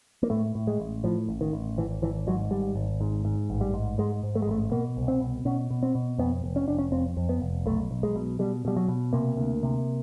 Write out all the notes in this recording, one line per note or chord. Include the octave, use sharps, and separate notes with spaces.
A#3
A2 A3
A2
G#3
A1
A2 F3
A1
D#3
A1
G#1 E3
G#1 E3
G#2 F#3
G#1 G3
G#1
G#2
G#2
A1
G3
G#2
G#2 G#3
G#2
A3
G#3
A1 A3
B2 A#3
C2
C4
B2
B2 C#4
B2
C4
B2
F2 B3
F1
C#4
F1 D4
C#4
F2 C4
F2
B3
F1
B1 A3
B1
G#3
B2
B2 G3
B2 G3
F#3
B2
C3 A#3
D2
C3